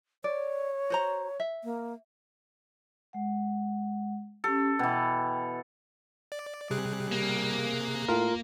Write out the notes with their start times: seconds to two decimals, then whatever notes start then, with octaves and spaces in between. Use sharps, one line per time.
0.24 C#5 D5
0.90 F#4 C5 A#5
1.40 E5
1.64 A#3
3.13 G#3 F#5
4.44 C#4 G4 A4
4.79 B2 E3 G5
6.32 D5
6.71 C3 G3 G#4 F#6
7.11 A#3
8.08 A2 F4 A#4